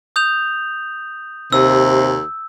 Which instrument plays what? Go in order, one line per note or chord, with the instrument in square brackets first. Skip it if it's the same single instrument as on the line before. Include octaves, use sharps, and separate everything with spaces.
[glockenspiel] D#6 G6 F7
[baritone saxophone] D#2 [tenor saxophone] C3 [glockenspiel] E6